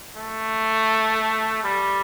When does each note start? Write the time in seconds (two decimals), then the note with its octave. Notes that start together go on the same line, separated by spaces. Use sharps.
0.16 A3
1.64 G3